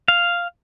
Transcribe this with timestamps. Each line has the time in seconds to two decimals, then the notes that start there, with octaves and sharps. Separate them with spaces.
0.08 F5